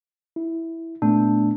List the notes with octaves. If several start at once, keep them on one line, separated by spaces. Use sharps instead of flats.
E4
A#2 A3 B3 D4